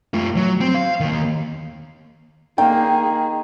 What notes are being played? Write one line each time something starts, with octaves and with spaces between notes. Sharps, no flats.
A3 F4
F#3
C4
F5
D#3 A#3
D#3 A#3 G#4 G5